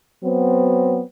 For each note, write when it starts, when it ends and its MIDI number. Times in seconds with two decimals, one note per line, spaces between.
0.23 1.00 54
0.23 1.00 59
0.23 1.00 60